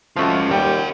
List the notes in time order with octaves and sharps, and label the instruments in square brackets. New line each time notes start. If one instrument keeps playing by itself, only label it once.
[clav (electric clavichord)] F3 A3 F#4 [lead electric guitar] C#4 F4
[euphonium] D#2 [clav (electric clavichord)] G3 [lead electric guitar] A#4 F#5 [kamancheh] G5